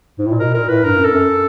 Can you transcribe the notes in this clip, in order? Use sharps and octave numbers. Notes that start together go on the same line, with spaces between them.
G#2
A2
A#2
B2 A#4
A#2 A#4
A2 B4
G2 A#4
F#2
A4
F#2